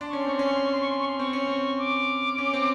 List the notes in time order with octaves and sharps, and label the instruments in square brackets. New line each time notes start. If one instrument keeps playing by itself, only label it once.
[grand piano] D4 [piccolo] C6
[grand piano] C#4 [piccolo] C#6
[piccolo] C6
[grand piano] C4 [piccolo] C#6
[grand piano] C#4 [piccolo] C6
[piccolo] C#6
C6
C#6
C6
C#6
C6
C#6
C6
[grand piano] C4 [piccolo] C#6
[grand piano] C#4
C4
[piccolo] D6
[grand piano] C#4
C4